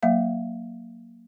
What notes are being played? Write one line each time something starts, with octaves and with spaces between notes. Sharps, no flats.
F#3 A#3 E5 F5